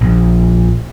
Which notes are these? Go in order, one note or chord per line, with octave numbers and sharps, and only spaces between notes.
A#1